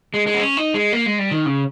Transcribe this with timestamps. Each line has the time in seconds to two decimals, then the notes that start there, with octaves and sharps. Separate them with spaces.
0.14 G#3
0.27 G#3
0.34 B3
0.40 C#4
0.57 D#4
0.74 G#3
0.93 A#3
1.06 G#3
1.19 G3
1.32 D#3
1.46 C#3